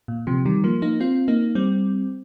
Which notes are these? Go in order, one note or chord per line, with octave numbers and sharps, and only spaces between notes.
A#2
C3 F3
D#3 G3
F3 A#3
A#3 D#4
C4 F4
A#3 D#4
G3 C4